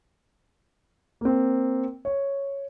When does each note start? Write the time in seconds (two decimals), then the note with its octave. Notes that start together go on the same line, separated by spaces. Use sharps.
1.21 A#3 C4
2.05 C#5